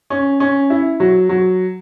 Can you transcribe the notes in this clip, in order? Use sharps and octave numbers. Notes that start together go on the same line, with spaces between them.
C#4
C#4
E4
F#3
F#3